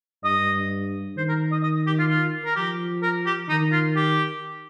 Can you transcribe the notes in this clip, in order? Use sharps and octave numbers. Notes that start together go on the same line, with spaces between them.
G2 D#5
D#3 C5
A#4
D#5
D#5
G4
F4
F4
A#4
F3 G4
A#4
G4
D#3 D#4
F4
G4